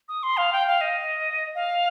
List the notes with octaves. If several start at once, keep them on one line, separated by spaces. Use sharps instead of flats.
D#6
C6
F5
G5
F5
D#5
F5